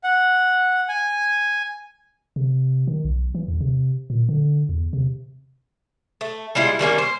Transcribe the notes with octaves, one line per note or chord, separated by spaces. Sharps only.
F#5
G#5
C3
D#3
B1
E3
E2
C3
A#2
D3
E2
C3
A3
G3 G#3 E4 F4
D#3 G3 A#3 C#4
C5